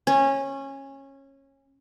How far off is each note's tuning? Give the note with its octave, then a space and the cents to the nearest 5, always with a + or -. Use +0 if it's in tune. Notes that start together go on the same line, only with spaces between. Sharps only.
C#4 -20